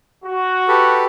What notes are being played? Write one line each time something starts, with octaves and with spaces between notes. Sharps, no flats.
F#4
G4 A4 B4